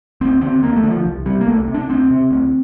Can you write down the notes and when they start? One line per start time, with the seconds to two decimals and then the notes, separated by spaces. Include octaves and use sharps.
0.21 D2 C4
0.41 D3 C4
0.62 D2 A#3
0.76 A3
0.83 D3
0.90 F3
1.05 C2
1.26 C3 G3
1.41 A#3
1.47 C2 A3
1.68 C3
1.74 D4
1.89 D2 C4
2.10 C3
2.31 D2